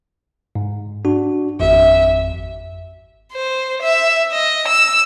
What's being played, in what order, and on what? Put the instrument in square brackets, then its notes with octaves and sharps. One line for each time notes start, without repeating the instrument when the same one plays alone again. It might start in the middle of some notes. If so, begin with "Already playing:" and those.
[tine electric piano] G#2
D4 F#4
[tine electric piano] G#1 F2 [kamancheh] E5
[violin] C5
E5
D#5
E6